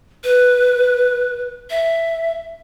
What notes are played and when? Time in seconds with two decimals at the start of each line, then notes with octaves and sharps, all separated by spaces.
0.24 B4
1.70 E5